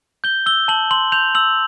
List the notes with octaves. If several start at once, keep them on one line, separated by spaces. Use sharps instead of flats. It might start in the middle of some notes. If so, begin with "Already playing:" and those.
G6 G7
E6 G7
A5 F#7
C6 F#7
G6 F7
E6 F#7